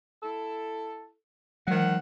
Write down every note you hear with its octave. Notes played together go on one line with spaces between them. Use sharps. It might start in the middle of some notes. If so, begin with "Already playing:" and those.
E4 A4
D#3 E3 F#3 G#3 F#5